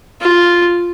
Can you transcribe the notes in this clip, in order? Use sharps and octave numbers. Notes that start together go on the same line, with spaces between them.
F4